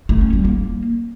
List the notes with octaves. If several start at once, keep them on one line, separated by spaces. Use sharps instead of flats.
A3
C#4
G3
A#3